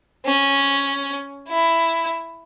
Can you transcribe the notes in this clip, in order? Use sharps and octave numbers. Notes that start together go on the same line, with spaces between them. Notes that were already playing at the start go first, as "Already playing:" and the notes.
C#4
E4